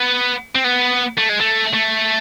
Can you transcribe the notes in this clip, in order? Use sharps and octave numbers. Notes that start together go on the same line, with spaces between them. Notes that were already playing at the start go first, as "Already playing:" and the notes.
Already playing: B3
C4
B3
A3
G#3
A3
A3